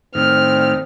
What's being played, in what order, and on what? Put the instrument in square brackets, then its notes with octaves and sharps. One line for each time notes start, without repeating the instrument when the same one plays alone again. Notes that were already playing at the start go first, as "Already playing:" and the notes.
[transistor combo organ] A2 D#3 [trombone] C4 [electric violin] F6